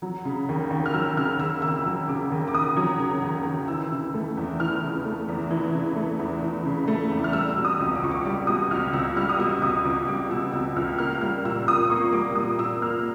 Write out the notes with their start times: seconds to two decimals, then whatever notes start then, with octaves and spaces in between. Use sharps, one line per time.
0.02 F#3
0.25 C#3
0.49 D#2
0.71 D#2
0.86 F6
0.93 F#3 E6
1.17 C#3 F6
1.39 D#2 E6
1.62 D#2 E6
1.86 F#3
2.08 C#3 D6
2.32 D#2
2.48 D6
2.54 D#2 D#6
2.76 F#3
2.99 C#3
3.23 D#2
3.46 D#2
3.68 E3 E6
3.91 C#3
4.14 A3
4.37 E2
4.60 E3 F6
4.82 C#3
5.05 A3
5.29 E2
5.50 E3
5.74 C#3
5.96 A3
6.19 E2
6.42 E3
6.65 C#3
6.88 A3
7.11 E2
7.24 F6
7.33 G3 E6
7.56 B2
7.65 D#6
7.80 C#2
7.95 D6
8.03 C#2 C#6
8.11 D6
8.25 G3 D6
8.47 B2 D#6
8.70 C#2 F6
8.93 C#2 E6
9.16 G3 F6
9.29 D#6
9.39 B2 E6
9.62 C#2 D#6
9.84 C#2 D6
10.08 G3 D6
10.30 B2 E6
10.53 C#2 E6
10.76 C#2 F6
10.99 A#3 F6
11.21 G3 F6
11.44 A#2 E6
11.68 A#2 D#6
11.90 A#3 C#6
12.13 G3 D6
12.35 A#2 D#6
12.58 A#2 E6
12.81 A#3 F6